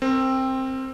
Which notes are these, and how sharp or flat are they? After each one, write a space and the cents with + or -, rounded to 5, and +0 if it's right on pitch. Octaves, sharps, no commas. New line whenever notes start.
C4 +10 A#4 -20